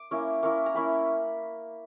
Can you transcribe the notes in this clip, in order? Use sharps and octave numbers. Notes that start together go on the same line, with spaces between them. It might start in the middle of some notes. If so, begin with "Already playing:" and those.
Already playing: D6
A#3 C#4 E4
A#3 C#4 E4 C#6
A#5
A#3 C#4 E4 B5